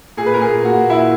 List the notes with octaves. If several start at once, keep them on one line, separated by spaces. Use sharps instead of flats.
A#2 G#4
B4
A#2 A#4
G#4
A#2
F#4
A#2
A#2 E4